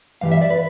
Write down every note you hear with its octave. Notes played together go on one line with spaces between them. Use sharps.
G2 E3 G3 F5
E5
D5
B4